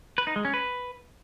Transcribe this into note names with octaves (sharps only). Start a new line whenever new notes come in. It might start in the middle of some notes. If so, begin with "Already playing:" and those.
B4
D#4
G#3
C#4
B4